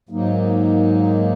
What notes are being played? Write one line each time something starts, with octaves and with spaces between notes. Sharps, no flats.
G#2 F#3 A#3 D#4